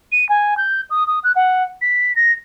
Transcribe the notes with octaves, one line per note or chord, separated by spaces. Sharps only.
D#7
G#5
G6
D#6
D#6
F#6
F#5
B6
A#6